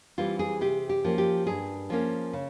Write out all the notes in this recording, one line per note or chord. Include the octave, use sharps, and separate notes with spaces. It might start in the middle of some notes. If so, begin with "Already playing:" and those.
E3 G3 C4 F4
G#4
C3 G4
G4
F3 A#3 C#4
G4
G2 G#4
F3 A#3 C#4
C#3